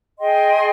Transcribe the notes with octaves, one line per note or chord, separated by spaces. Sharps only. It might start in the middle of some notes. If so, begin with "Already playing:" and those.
G#4 D#5 G5 C6